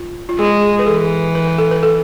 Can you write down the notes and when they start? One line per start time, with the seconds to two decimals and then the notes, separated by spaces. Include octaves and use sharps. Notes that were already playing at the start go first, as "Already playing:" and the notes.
Already playing: F4
0.29 F4
0.38 G#3 G#4
0.79 B4
0.86 E3 A4
1.35 B4
1.47 B4
1.58 A4
1.71 B4
1.83 A4